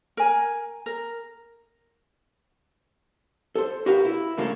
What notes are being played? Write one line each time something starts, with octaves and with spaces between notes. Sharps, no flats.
A#4 G#5
A#4
A4 C5
F#4 G4 A#4 B4 F5
E4
D2 C#3 A3 A#3 F5